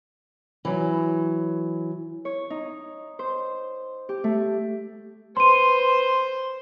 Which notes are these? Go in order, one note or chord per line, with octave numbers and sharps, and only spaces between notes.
E3 F#3
C#5
D#4
C5
G4
A3
B4 C5 C6 D#7